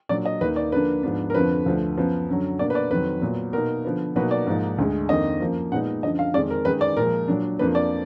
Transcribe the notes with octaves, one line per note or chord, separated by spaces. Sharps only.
A#2 F#3 D4 D5
D#5
D#2 D#3 A#3 D#4 B4
D5
D3 F3 A#3 D4 B4
G#2 F3 B3 D4
A#4
F2 D3 F3 B4
D2 D3 F3
F#2 F3 B3
F#2 D3 F#3
B2 A#3 D4 D5
B4
D5
F2 D#3 F#3 B4
A#2 F#3 B3
B2 A#3 D#4 A#4
D3 F3 B3
B2 F#3 A#3 D#4 B4
D5
G#2 F3 A#3 D#4
D2 D3 G#3
F2 D#3 A#3 D4 D#5
F#2 F3 A#3
A#2 G#3 B3 D#4 F#5
F#2 D3 F3 D#5
F5
F2 D#3 G#3 D5
A#4
F#2 D#3 G#3 D#4 B4
D5
A#2 F3 G#3 A#4
A#2 F#3 D4
F2 F3 A#3 D4 B4
D5